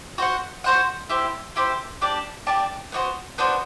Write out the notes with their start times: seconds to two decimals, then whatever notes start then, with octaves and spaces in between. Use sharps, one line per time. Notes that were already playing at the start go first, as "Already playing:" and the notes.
0.18 F#4 C5 F#5
0.64 F#4 C5 F#5
1.09 E4 G4 C5
1.56 E4 G4 C5
2.01 D4 G4 D5 A5
2.47 D4 G4 D5 A5
2.92 B3 D4 F#4 C5
3.38 B3 D4 F#4 C5